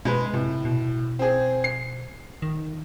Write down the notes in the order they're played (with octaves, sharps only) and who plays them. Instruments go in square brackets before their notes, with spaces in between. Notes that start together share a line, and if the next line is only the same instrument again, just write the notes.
[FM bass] B2 [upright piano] G#3 B4
[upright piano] A2 [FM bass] C3
[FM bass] B2
[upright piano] C4 G#4
C7
[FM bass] D#3